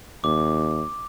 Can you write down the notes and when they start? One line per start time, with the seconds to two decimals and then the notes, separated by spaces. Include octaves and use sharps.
0.24 D#2 D6